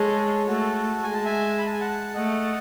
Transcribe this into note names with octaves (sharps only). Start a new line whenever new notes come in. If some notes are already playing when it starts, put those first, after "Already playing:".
Already playing: G#3 A4 C#5
A3 F#4 A4
G#3 G#5
A5
E5 G#5
B5
A5
G#5
F#5 A5
A3 D#5 F#5